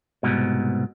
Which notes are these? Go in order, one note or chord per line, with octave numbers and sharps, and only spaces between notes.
C2 G#2 B2